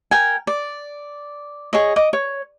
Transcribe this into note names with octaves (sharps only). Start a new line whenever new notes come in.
A#4 G5 G#5
D5
G#4 C#5 D#5
D#5 D6
C#5